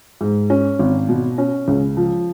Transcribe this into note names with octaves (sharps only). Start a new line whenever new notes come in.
G#2
C#4
G#1
B2
C#4
C#2
F3